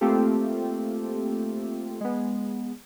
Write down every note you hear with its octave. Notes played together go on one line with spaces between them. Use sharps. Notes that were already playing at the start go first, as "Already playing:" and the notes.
A3 A#3 C4 F4 G4 A4
G#3 B3